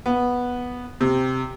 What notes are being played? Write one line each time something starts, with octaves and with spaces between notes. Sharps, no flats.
B3
C3